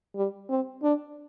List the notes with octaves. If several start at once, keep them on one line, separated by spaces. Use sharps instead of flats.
G3
C4
D4